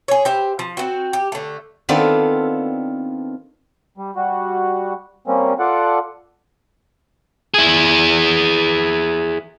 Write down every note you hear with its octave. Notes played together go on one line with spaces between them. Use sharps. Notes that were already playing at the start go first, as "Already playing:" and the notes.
G#4 C#5
G4 C5 E5
F3
C4 F#4
G4
D3 A3
D#3 B3 C4 D4 F4 A4
G3
G3 F#4
G3 A#3 C4 C#4
F4 A4 D5 F#5
E4 G#4